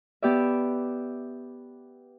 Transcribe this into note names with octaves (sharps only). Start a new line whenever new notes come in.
B3 G4 D5 E5